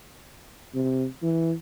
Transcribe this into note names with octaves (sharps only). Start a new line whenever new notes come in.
C3
E3